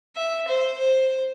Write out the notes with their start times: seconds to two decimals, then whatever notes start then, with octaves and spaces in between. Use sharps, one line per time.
0.16 E5
0.47 C5
0.78 C5